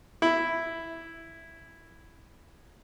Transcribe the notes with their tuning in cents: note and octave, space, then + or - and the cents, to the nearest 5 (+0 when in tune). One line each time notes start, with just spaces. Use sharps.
E4 +0